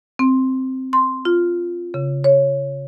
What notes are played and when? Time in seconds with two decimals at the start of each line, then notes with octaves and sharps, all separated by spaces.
0.19 C4
0.93 C6
1.25 F4
1.94 C#3
2.24 C#5